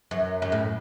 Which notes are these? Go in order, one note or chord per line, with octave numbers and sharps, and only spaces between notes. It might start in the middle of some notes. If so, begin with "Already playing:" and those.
F#2
F#2
A2